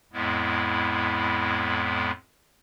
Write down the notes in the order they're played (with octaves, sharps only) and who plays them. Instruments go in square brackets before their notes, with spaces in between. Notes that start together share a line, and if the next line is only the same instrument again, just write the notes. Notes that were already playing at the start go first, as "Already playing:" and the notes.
[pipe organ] F2 A2 G#3 B3 E4